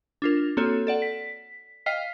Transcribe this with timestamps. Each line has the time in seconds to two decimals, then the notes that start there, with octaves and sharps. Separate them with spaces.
0.22 D4 F4 A#4
0.57 A#3 C4 F#4 A4 C#5
0.87 A4 D5 F#5
1.02 B6
1.86 D#5 F5 G5 F6 B6 C7